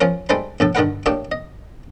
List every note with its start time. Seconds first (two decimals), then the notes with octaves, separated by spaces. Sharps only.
0.01 F3 C#4 A#4
0.29 G3 G#3 A4 B4 C5 B5
0.60 A#1 A2 A4
0.75 G2 D3 D#3 A#4 B4 F#5
1.06 A2 A#3 D4 G4 C#5
1.32 D#5